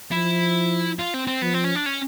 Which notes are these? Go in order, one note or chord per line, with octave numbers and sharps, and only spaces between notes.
F3 E4
F4
C4
C4
F3 B3
C4
C#4
D4
C#4